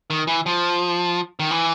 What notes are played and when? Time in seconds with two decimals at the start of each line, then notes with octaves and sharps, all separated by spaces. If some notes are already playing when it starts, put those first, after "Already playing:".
0.10 D#3
0.27 E3
0.46 F3
1.40 D#3
1.51 E3